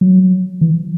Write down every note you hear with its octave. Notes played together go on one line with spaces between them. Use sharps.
F#3
E3